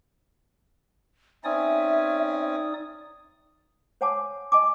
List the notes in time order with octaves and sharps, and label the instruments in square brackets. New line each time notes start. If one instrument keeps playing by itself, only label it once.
[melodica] C4 C#4 G#5 [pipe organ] D#4 D5 D#6 [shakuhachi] E5
[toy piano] C5 C#5 F#5 G#5 A5 D6
D#5 G#5 A5 D6